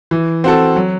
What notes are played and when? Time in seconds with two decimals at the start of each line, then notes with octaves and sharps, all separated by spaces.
0.11 E3
0.44 C4 F#4 A4
0.76 F#3